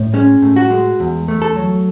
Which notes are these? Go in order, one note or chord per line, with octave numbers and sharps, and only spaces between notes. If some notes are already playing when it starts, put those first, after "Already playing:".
Already playing: A2
G#3 C#4
A2
F#4
G#3
E2
A3
A4
F#3